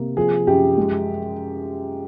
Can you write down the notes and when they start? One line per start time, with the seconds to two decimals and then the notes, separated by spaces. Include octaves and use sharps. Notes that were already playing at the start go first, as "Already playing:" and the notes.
Already playing: C3 A#3
0.17 F3 G#4
0.47 F#2 G4
0.77 G#3